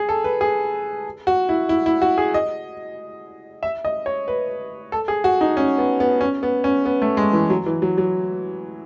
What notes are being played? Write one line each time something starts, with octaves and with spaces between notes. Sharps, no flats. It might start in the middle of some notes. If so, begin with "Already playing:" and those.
Already playing: G#4
A4
B4
G#4
F#4
E4
E4
E4
F#4
G#4
D#5
E5
D#5
C#5
B4
A4
G#4
F#4
D#4
C#4
B3
B3
C#4
B3
C#4
B3
A3
G#3
E3
F#3
E3
F#3
F#3